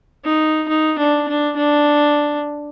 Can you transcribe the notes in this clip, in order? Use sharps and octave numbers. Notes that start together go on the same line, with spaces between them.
D#4
D#4
D4
D4
D4